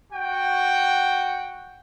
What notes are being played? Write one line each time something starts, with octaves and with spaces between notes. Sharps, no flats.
F#4 F#5 G5